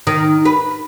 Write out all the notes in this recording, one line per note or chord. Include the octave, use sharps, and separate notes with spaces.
D#3
B4